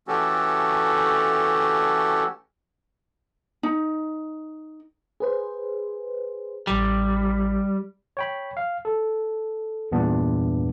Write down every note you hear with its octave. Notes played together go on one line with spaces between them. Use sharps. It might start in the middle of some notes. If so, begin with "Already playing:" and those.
E3 A3 C#4 F#4 G4 A4
D#4
G#4 B4 C5
A1 G3 G5
C#5 G5 B5
F5
A4
E2 G2 A#2 B3 D4